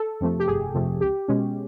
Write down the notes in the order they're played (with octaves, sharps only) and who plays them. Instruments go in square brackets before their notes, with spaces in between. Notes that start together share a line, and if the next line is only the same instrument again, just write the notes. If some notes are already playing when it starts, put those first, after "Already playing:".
Already playing: [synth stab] A4
F2 C3 F3 A3
G4
G1 G#4
F2 C3 F3 A3
C#2 G4
B2 G#3 C#4